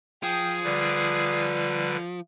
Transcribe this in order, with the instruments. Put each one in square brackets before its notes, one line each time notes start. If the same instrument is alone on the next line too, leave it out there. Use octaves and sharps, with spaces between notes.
[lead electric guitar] F3 [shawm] G#4 [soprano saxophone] G5 [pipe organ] D#6
[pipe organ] D3 G3 B4 [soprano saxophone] D5